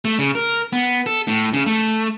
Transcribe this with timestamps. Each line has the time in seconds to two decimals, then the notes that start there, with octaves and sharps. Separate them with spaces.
0.05 A3
0.19 C#3
0.35 A#4
0.73 B3
1.06 A4
1.28 A2
1.53 C#3
1.66 A3